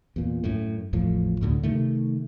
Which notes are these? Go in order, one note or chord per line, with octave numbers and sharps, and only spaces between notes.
E2 A#2
F#2 A2
G#1 E2 A2 F3
D2 A2 D3 F#3
C3 D#3 A3